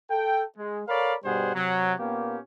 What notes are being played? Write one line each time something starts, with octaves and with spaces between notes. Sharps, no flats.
A4 G5
G#3
A4 A#4 C#5 D5 F5 B5
G2 B2 G3 G#4 C5 F#5
C3 F#3
A#2 A#3 B3 C#4 G4